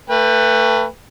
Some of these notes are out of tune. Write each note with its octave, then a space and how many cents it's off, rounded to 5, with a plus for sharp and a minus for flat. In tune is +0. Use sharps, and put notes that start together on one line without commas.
A3 +30 B4 +0 G5 +35